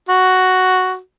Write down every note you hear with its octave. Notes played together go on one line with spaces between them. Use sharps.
F#4